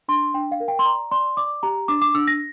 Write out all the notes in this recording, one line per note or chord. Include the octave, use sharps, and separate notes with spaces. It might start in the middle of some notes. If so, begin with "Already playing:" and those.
D4 C6
D4 G5
F5
A#4
G5
C6
D5 A#5
D5 C6
D5 D6
G4 A#5
D4 D6
D6
D4 E6
A#6